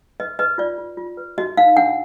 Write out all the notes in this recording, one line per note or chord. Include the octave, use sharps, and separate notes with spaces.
B4 D#5
B4 D#5
F4 D5
F4
F4
B4
F#4 D#5
D#4 F5
D4 F#5